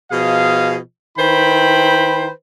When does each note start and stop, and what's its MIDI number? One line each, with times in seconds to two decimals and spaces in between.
0.11 0.77 47
0.11 0.77 53
0.11 0.77 68
0.11 0.77 75
0.11 0.77 77
1.18 2.29 51
1.18 2.29 64
1.18 2.29 71
1.18 2.29 72
1.18 2.29 79
1.18 2.29 83